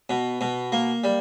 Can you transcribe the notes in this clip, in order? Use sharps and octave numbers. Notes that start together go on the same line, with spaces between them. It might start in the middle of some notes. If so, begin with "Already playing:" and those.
B2
B2
A#3
G3